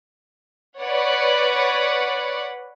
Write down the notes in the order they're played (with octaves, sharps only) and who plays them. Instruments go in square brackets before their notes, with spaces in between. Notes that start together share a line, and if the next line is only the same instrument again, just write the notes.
[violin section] B4 C#5 D5 F#5